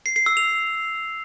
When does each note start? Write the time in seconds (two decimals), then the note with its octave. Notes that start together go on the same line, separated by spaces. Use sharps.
0.06 C7
0.16 C7
0.26 E6
0.37 F7